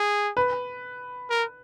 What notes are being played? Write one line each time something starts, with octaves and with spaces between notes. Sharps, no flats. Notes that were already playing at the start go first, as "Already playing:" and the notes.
Already playing: G#4
B4
A#4